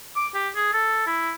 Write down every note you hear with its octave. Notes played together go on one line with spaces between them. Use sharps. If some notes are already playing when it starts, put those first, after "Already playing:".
D6
G4
G#4
A4
E4